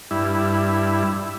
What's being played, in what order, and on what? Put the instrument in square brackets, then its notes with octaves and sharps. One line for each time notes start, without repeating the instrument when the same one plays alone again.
[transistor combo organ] G2 E4